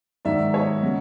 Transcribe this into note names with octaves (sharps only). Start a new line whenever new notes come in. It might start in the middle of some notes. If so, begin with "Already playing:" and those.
G#2 D#3 F#3 D5 E5
C#5 D#5
C#3 F#3